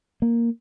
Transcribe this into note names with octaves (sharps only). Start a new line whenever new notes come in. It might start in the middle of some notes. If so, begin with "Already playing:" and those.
A#3